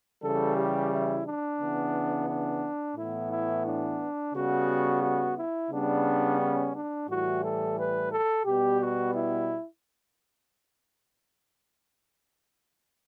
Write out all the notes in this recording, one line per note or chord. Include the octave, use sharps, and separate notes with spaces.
C#3 E3 G3 A4
G4
E4
D4
C#3 E3 B3
D4
A2 E3 B3 E4
E4
D4
C#3 G3 B3 F#4
F#4
E4
C#3 G3 B3 D4
C#4
D4
A2 E3 G3 F#4
A4
B4
A4
B2 G3 B3 G4
F#4
E4